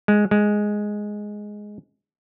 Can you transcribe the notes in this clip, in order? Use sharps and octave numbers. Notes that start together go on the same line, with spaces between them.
G#3
G#3